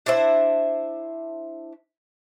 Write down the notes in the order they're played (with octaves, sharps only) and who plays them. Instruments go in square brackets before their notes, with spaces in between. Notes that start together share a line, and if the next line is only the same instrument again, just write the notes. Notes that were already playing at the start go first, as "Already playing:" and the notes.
[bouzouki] D4 E4 C5 E5